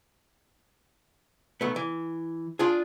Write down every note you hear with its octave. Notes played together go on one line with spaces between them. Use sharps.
B1 A3 B3
E3
D4 F4 G#4